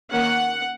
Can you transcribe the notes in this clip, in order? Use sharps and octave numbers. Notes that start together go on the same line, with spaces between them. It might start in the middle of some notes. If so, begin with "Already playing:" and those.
D#3 A#3 C#4 F#5